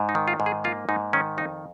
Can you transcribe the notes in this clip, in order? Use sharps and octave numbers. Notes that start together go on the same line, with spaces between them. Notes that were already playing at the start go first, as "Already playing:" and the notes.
Already playing: G#2
D#4
D#3
F4
G#2
G#4
A#3 F4
G#2 D#4
D#3 C#4
F2 D#4